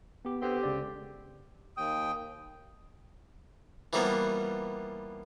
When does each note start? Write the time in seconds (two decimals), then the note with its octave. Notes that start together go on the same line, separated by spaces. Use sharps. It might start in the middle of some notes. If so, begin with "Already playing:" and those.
0.25 B3 G4
0.42 D3 B3 C4 G4
0.63 C#2 C#3 D5
1.77 D#2 G5 D#6
3.93 E3 F3 G3 A#3 B3